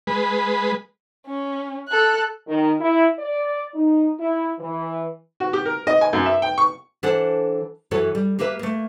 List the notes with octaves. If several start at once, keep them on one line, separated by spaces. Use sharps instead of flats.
G#3 B4
C#4
A4 F#6
D#3
E4
D5
D#4
E4
E3
F#4
G4
A#4
D#5
G#5
F#2
E5
G5
C#6
E3 D4 A4 C5 F#5 A5
F#2 E3 F#4 A4 C#5
G3
A#3 G4 A#4 B4 E5
A3 A#3